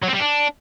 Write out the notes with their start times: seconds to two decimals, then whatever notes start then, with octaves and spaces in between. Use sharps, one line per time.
0.03 F#3
0.09 C4
0.15 G3
0.20 D4